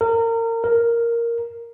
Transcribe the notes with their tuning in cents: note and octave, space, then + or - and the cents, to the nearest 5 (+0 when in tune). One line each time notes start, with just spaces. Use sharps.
A#4 -30
A#4 +0